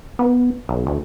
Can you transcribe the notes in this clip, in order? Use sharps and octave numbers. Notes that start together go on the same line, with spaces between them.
B3
B1
D2